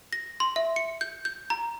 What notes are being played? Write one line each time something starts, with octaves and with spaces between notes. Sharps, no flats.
A#6
C6
E5
C#7
G6
G6
A#5